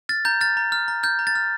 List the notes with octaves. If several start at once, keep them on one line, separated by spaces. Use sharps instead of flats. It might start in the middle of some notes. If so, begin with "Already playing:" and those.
F6 A6
A#5 G6
F6 A6
A#5
F6
A#5
F6 G6
A#5
A6
F6